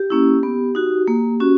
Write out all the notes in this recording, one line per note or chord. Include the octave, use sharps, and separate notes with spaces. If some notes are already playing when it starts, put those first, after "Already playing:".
Already playing: G4
A#3 C#4 E4
B3
D#4 F#4
A#3
C#4 F#4